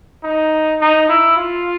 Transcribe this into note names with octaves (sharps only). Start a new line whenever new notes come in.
D#4
D#4
E4
F4